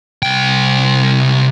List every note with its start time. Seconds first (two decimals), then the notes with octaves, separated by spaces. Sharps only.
0.23 C2 G5